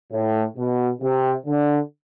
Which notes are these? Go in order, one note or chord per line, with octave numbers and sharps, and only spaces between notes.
A2
B2
C3
D3